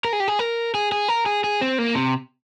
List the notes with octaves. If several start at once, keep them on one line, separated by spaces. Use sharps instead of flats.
A#4
G#4
G4
G#4
A#4
G#4
G#4
A#4
G#4
G#4
C4
A#3
C3